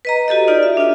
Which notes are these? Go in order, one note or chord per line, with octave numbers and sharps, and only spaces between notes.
B4 D#5 A#5
F#4 G4 A4 D#5
D#4 F4 D5
E5
D4 F4